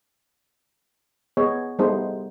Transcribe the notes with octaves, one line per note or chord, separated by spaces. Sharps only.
B3 G#4 C#5 D#5
G3 A3 B3 D#4 G#4 C5